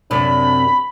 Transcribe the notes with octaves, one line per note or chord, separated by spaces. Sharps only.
F#2 C3 D4 B5